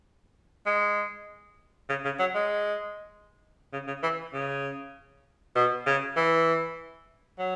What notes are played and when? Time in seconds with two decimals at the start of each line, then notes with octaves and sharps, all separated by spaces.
0.66 G#3
1.89 C#3
2.05 C#3
2.19 F#3
2.35 G#3
3.73 C#3
3.87 C#3
4.03 E3
4.34 C#3
5.56 B2
5.86 C#3
6.17 E3
7.39 F#3